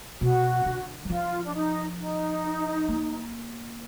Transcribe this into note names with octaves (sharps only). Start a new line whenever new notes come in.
B2 F#4
D3
F#3
F3 F4
D4
D#4
D#4
A#3